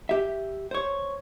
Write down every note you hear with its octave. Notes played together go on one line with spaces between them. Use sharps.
G4 E5
C5 C#5